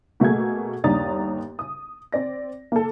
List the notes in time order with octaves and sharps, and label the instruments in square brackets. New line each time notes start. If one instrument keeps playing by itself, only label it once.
[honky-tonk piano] B2 A3 A#3 G#4 G#6
G1 D#2 D4 A#5 D#6 A6
D#6
C4 D5 A#6
A#3 A4